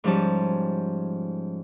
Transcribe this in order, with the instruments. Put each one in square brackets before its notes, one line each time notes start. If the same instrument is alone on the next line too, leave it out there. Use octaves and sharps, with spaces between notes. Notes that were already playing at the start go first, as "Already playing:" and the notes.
[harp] G#2 F3 G3 C#4 A5